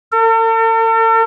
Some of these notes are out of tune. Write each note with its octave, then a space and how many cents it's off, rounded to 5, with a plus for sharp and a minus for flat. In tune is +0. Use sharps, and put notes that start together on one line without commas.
A4 +45